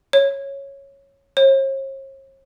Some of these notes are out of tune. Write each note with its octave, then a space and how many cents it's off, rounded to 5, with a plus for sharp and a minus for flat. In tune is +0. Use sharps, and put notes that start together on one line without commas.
C#5 -5
C#5 -45